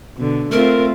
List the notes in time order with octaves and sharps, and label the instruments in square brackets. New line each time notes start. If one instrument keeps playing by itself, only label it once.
[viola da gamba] B2 D3
[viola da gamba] A3 C4 F4 [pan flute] A#4